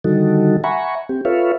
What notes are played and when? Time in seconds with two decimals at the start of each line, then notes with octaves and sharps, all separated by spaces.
0.04 D3 D#3 G3 D#4 F#4 A4
0.64 E5 F#5 G#5 A#5 B5 C#6
1.09 C4 G4
1.25 F4 A4 B4 C#5 E5 F5